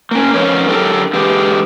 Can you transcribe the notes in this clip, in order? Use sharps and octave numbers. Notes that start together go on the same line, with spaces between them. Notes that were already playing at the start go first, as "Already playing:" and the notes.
A#3 C#4
F3 B3 C#4 D#4 A#4 C#5
D3 F#3 G4 A4 A#4
D3 E3 G#3 G4